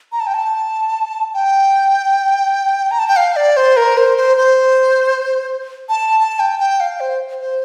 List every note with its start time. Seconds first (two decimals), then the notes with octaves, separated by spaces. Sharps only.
0.12 A#5
0.20 A5
0.27 G5
0.34 A5
1.34 G5
2.91 A#5
2.99 A5
3.08 G5
3.16 F5
3.36 D5
3.57 C5
3.77 A#4
3.97 C5
4.17 C5
4.37 C5
5.89 A5
6.20 A5
6.40 G5
6.60 G5
6.80 F5
7.00 C5
7.41 C5